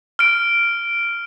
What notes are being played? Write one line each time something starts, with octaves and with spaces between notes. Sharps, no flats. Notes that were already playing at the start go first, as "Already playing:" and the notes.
F6 D7